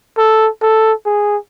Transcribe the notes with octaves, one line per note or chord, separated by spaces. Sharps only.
A4
A4
G#4